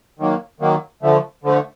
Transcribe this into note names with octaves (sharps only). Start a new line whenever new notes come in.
D#3 F#3 A#3
D#3 F#3 A#3
D3 F3 A3
D3 F3 A3